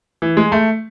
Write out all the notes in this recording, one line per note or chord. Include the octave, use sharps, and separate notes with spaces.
E3
G#3
A3